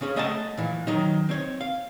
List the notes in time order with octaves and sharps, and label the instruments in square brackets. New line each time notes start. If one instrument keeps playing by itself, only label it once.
[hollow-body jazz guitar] C#3 C#4 G#4
A3 D#5 F#5 G#5 A5
A#2 E3
D#3 F#3 D#4
C4 C#5
F5